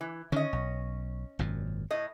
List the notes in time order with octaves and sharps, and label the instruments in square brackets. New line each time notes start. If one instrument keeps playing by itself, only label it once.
[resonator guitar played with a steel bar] E3
[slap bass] D3 D#3 [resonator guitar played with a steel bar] C#4 D#5
[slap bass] B1
G#1 F#2 A#2
[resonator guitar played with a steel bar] A2 D#5